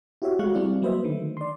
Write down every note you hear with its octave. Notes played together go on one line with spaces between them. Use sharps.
E4 F#4 G4 C#5 E5
G#3 A3 F#4 F5 C#6 F#6
G3 C4 E4 D5
F#3 A#3 B4 C5 D#5 E5
D3 D#3 A3
D5 C6